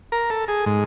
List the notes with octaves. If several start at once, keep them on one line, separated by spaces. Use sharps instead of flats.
A#4
A4
G#4
G#2